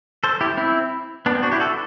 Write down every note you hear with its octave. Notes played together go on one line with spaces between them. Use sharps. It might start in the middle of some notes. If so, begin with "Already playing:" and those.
A4 C5
E4 G4
C4 E4
B3 D4
C4
D4 F#4
E4 G4
F#4 A4